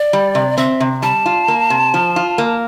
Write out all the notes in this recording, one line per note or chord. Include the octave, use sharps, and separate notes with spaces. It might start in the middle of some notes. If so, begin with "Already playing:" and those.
Already playing: D5
G3
C3
C4 E5
C3
G3 A5
F4
A#3
C3
F3
F4
A#3